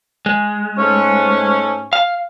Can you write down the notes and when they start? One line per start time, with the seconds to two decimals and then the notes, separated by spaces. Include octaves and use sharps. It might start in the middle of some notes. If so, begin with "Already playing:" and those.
0.26 G#3
0.78 G#2 A3 C#4
1.93 F5